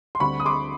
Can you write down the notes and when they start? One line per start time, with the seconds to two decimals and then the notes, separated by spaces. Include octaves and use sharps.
0.15 C6
0.20 D2 D3 G3 C4 B5 C#6
0.40 D#6
0.46 C6 D6